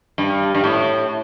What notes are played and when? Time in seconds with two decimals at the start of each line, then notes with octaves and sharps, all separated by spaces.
0.18 G2
0.55 G2
0.64 A2